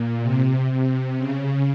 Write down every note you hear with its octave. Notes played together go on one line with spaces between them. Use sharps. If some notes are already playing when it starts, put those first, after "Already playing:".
Already playing: A#2
C3
C3
C#3